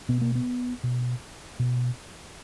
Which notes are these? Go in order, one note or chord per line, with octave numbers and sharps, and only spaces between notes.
B2 B3
A#3
B3
B2
B2